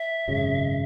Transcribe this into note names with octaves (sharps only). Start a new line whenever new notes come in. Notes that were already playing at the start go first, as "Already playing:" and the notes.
Already playing: E5
G#1 F#2 C#3 F#3